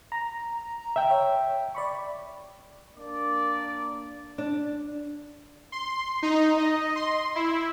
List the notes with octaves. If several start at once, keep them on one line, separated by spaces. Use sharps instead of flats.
A#5
E5 G5
C#5
D5 B5 C#6
A#3 D4 D5
D4
C6
D#4
D#5
C6
E4